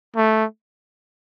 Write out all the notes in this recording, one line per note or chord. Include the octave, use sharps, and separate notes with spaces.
A3